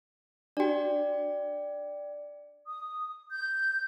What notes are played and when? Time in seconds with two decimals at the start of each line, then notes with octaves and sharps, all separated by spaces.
0.57 D4 F#4 D5 G5
2.65 D#6
3.32 G6